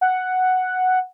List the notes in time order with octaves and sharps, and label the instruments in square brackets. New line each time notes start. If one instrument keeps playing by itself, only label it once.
[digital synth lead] F#5